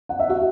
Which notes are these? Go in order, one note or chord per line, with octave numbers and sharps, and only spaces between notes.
F#5
E5
F#4 F#5